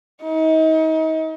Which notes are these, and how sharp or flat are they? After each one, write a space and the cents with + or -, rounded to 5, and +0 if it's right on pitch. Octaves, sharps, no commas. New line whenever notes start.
D#4 +35